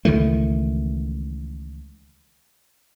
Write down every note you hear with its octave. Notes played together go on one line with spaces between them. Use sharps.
C#2 D#3 E3 A3